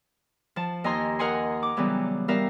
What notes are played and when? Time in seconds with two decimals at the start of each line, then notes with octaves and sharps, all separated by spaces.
0.56 F3 A5
0.84 D#2 D#5 G#5 A#5 C6
1.19 A#4 D#5 F#5 G#5 C6
1.63 D6
1.76 C#3 E3 F#3 G3 B3
2.28 G3 B3 A#4 E5 F5